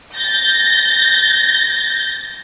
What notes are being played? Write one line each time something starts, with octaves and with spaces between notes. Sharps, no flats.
G6 A6 A#6